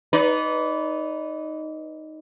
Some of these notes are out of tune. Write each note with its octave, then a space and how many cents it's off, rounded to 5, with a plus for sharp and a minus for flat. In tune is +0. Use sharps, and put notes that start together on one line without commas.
D#4 +0 B4 +10 D5 -30